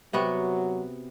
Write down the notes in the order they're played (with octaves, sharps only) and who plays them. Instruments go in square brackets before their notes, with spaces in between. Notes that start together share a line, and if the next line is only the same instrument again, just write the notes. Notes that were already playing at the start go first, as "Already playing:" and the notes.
[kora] C3 B3 F#4 [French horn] F#3